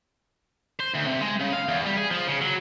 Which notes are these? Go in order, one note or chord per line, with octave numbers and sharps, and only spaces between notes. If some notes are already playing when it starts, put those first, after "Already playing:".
C5
D2
C3
G#3
C#3
F5
E2
G3
G#4
F3
C#3
F#3